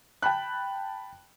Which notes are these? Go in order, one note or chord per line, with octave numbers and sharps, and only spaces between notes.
G5 A5 B5 F#6